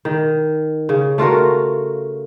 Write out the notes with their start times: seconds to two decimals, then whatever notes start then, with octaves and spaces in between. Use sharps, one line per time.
0.05 D#3
0.89 C#3
1.18 A3 F4 F#4 A#4